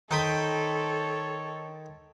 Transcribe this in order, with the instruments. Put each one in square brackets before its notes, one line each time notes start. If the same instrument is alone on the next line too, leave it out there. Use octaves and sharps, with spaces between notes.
[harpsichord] D#3 G5 B5 [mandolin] D#4 C5 [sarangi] A4 [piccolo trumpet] C#5